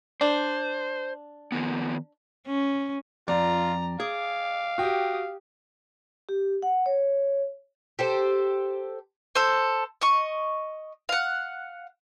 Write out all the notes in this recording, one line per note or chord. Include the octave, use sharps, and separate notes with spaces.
D4 C5
D#3 F3 B3
C#4
F2 F4 D5 A#5
G#4 F5 D6
F#4 G4 G5 D#6
G4
F#5
C#5
G4 A4 C5
A4 C5
D#5 C#6
F5 F#5